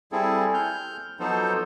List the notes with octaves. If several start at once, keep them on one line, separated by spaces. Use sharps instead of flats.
G3 C4 E4 G#4 A4
F6 G6
F3 F#3 B3 D#4 A4 C5